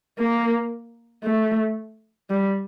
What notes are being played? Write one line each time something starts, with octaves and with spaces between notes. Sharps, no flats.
A#3
A3
G3